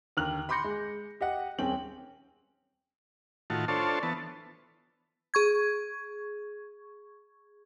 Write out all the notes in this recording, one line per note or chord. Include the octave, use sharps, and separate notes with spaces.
D#2 D3 A#5 F6 F#6 F#7
B5 C6 D6 G6 A#6 C#7
G#3
G4 D#5 F#5
D#1 C4 C#4 G#4 G5 F#7
A2 D#3 F4 F#4 A5
D4 F4 A4 C5 C#5 A5
E3 B3 A5
G#4 C#6 G#6